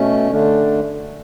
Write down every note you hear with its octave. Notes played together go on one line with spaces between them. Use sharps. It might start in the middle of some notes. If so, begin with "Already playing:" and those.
Already playing: B2 A3 C#4
D3 A3 D4